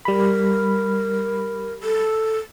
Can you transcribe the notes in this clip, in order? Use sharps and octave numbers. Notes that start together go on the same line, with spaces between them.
G3 A#4 B5
A4